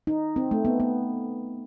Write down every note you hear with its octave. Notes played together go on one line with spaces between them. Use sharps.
D#4
C4
A3
B3
B3